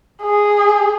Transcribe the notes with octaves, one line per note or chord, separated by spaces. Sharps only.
G#4